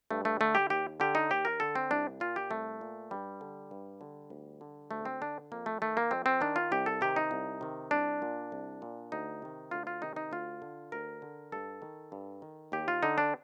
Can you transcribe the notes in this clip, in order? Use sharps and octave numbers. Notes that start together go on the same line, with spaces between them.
G2 A3
A3
D3 A3
G4
D#2 G4
D3 G4
D#4
D#2 G4
A#4
D3 A4
C4
C2 D4
A#2 F4
G4
C2 A3
A#2
G2 G3
D3
G2
D3
D2
D3
D2 A3
C4
D3 D4
F2 A#3
A3
D#3 A3
A#3
F2 C4
C4
D#3 D4
F4
C2 G4
A4
C3 D#3 G4
D#4
C2
C3 D#3
C2 D4
A#2
C2
A#2
D2 D#4
C3 D#3
D2 F4
F4
C3 D#3 D#4
D#4
D2 F4
D3
D2 A#4
D3
G2 A4
D#3
G2
D#3
D#2 G4
F4
D3 D#4
D4